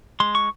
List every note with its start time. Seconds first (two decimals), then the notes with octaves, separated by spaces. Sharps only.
0.20 G#3 C6
0.35 C#6